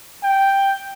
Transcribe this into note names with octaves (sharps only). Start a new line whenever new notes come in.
G5